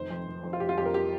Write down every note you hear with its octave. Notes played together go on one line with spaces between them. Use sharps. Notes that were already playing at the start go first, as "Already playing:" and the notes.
Already playing: F1 D#3 C5
F2
F1
F2
F4
F1 G4
F4
F2 G4
A#4
G4